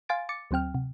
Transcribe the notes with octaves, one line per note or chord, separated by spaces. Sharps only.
F5 G#5 C6 A6 D7
D6 A6 C#7
D2 F#3 C4 G5 F6
C3